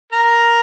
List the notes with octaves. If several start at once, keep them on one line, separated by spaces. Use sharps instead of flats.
A#4 A#5